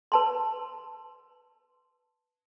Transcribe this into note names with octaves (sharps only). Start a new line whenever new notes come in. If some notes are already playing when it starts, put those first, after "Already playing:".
B4 A5 C6